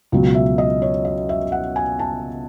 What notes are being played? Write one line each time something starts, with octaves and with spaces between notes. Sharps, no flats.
C#2 B2 F#3
E5
D#5
C#5
D#5
E5
F#5
G#5
A5